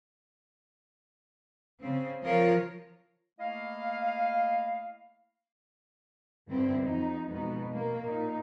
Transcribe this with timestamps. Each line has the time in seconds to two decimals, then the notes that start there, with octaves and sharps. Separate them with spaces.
1.81 C#3 C4
2.23 F3 F4 A#4 C#5
3.39 A3 A#3 E4 D#5 F5
6.49 G2 D3 B3 C4 E4
6.82 F2 D#4
7.28 F2 B2 G#3 B3 D#4
7.69 B2 A#3
8.02 A#2 D#4